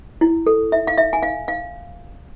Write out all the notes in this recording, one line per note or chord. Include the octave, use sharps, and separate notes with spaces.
E4
A4
E5
F5
E5
G#5
F5
F5